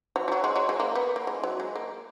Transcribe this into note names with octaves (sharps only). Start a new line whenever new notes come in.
F#3
F3
F#3
G#3
F#3
G#3
A#3
B3
A#3
G#3
F#3
G#3
A#3